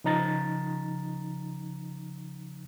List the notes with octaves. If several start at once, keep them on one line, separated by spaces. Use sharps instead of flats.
C#3 F3 D#4 A#5 A6